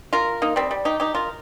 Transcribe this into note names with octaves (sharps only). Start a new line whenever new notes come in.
F4 A#4
A#3 D#4
G3 C4
G3
D#4 G4
D#4 G4
F4 A#4